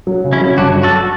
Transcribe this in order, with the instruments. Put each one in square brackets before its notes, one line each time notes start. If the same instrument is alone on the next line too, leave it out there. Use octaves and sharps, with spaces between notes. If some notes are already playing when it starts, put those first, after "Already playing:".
[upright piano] F#3
C#3
[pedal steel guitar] C#4 E4
[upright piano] F#3
[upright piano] G1 [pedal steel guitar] D4 F#4
[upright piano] F#3
[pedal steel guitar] F#4 A4